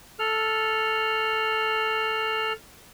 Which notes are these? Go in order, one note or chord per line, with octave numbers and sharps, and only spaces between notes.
A4 F6